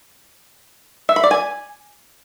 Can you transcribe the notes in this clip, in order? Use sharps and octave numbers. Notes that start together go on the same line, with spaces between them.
E5
B5
D5
G#5